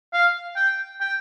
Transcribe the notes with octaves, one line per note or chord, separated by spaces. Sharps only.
F5
G5
G5